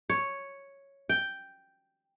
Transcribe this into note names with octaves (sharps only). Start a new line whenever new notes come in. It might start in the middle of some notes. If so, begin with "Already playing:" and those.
C#5
G5